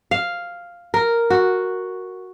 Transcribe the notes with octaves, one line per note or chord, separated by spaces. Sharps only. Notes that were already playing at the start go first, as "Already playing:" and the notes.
F5
A#4
F#4